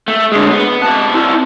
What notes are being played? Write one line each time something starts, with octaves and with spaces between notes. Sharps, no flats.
A3
D3 G#3
B3
C3 A5
C4 E4